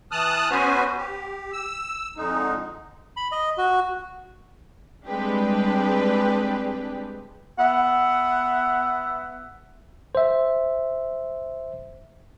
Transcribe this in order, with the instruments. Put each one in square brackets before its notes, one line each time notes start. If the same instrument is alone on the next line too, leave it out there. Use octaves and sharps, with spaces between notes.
[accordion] E3 A5 D#6 F6 F#6
B3 C#4 F#4 B4 C5 G#5
G4
E6
F2 D3 G#3 D#4
[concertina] B5
D#5
F#4
[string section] G3 G#3 C4 D4 G4 B4
[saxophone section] B3 E5 F#5
[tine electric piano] C5 E5